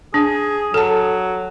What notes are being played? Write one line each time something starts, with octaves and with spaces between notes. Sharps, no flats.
D4 G#4
F#3 A4 A5